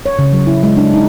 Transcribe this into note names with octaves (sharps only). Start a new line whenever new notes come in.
C#5
C#3
F#3
E4
G#3
D4
D#4